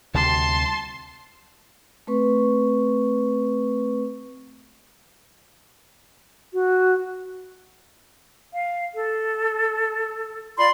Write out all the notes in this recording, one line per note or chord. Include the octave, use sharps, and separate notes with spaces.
D2 C3 G3 A5 C6
A3 C4 B4 C#6
F#4
F5
A4
F4 D5 B5 C6